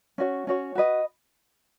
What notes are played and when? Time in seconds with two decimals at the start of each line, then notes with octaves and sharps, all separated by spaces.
0.18 C#4 F#4 C#5
0.47 C#4 F#4 C#5
0.75 F#4 B4 D#5